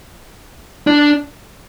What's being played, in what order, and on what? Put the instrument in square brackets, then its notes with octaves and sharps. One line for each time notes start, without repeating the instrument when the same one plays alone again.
[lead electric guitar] D4